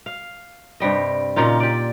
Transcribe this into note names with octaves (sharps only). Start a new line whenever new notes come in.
F5
G2 C3 G3 D#5
A#2 C#3 D#4 F4
G4 D5